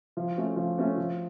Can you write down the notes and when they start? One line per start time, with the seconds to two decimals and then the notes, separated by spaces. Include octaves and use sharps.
0.17 F3
0.37 A3 C#4 F#4
0.56 F3
0.78 A3 C#4 F#4
0.97 F3